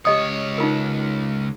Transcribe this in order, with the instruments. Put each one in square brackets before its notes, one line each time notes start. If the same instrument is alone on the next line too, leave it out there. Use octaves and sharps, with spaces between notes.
[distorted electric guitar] C#2 C#5 [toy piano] G4 D#5 D#6
[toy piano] D#4 F4 A#4